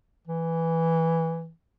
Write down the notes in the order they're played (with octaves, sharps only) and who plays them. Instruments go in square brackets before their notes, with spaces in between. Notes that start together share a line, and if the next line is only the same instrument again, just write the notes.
[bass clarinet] E3